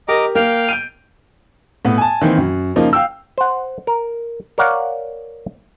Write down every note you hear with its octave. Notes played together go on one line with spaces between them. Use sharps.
G4 A#4 D#5 A#5 D6
A#3 F5 G5 F6
G6 D7 D#7
A2 B3
G#5 A5
D#3 E3 A#3 C4
F#2
C#3 F3 A#3 D#4
F5 G5 E6
C5 F#5
A#4
A#4 C#5 D5 F5 F#5